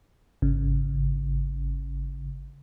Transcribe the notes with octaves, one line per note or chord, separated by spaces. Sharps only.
G#1 C#3